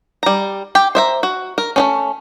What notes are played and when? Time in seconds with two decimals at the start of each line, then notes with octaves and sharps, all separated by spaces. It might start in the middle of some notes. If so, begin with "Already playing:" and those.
0.23 G3 A#5
0.75 G4 G5
0.95 C5 E5 A#5
1.23 F#4
1.58 A#4
1.76 A3 C4 C#4